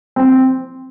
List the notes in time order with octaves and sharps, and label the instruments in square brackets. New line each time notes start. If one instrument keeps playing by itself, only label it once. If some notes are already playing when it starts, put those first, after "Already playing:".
[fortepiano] C4